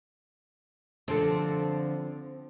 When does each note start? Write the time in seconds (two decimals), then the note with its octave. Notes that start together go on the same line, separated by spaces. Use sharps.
1.08 D3 F3 C4 A4